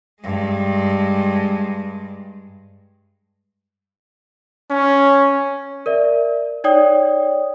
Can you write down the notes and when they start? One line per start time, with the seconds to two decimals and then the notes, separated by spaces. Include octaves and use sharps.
0.22 G2 G#3
4.71 C#4
5.86 A#4 D5 E5
6.64 D#4 C#5 D5 G5 D#6